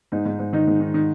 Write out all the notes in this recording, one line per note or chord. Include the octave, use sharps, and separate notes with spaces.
G#2 D#4
G#2
G#2
D#3 D#4
G#2
D#3
D#3